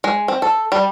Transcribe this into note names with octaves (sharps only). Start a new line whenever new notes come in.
G#3
C4
A4
G3